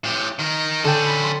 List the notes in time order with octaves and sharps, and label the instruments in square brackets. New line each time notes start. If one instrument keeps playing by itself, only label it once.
[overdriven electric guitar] A2 G4
D#3 A#4
[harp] D3 G5 [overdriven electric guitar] C#4 A4
[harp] B5
C6